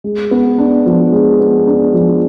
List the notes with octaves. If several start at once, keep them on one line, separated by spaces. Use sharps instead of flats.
G#3
B3
D4
F3
G#3
B3
D4
F3